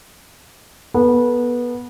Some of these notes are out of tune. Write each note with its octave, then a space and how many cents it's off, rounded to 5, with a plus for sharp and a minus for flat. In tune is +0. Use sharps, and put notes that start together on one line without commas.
B3 -20 A4 -5